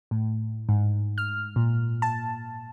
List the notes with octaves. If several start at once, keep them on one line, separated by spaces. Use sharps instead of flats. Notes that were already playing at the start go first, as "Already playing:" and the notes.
A2
G#2
F6
A#2
A5